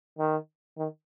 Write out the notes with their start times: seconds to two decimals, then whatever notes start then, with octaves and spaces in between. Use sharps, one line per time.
0.18 D#3
0.78 D#3